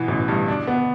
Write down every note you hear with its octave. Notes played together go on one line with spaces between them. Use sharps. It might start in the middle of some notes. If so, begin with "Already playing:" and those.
Already playing: B2 E3 B3
A1
G2
D4
B3